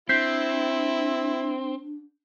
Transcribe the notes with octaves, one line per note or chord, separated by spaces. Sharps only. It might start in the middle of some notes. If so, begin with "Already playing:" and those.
C4 D4 E4 G6 B6 C7